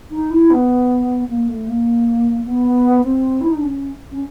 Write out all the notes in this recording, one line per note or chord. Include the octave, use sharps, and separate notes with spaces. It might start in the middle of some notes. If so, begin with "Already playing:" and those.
D#4
E4
B3
A#3
A3
A#3
B3
C4
E4
D#4
D4
C#4
C#4